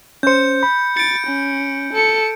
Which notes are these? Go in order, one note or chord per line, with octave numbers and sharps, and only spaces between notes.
C#4 C5 G6 C#7
B5
A6 C#7 D7
C#4
A4 C#7